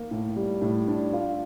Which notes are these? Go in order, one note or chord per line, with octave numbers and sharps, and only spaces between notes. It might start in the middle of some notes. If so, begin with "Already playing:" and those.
Already playing: A#3
A2
G3
A2
D4
F4